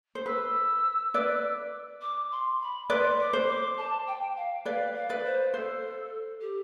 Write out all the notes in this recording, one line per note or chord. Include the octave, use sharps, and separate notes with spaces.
C5
B4 E6
B4 D5
D6
C6
B5
B4 D5 C6
D6
C5
D6
A5
G5
F5
B4 D5 F5
F5
B4 D5
C5
A4 C5
G4